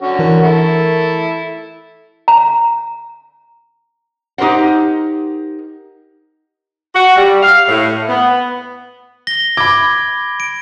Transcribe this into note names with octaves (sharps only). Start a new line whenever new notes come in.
D3 C#4 F#4
E3 A#4
E4 A4
A#5
D#4 G4 A#4 C5 F#5
F#4
G3
F5
A2
B3
A#6 G7
B5 D6 G#6
D7